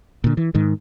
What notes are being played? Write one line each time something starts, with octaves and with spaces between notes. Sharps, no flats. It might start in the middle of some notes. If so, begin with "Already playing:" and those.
A#2 D3
E3
G#2 D#3